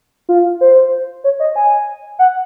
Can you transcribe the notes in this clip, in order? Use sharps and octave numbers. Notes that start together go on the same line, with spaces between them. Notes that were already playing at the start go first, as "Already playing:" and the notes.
F4
C5
C#5
D#5
G#5
F#5